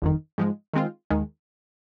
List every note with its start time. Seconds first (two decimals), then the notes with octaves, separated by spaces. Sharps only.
0.02 G1 F2 D#3
0.38 G#2 F3 G#3
0.73 D#3 G#3 C4 F4
1.10 D#2 D#3 G#3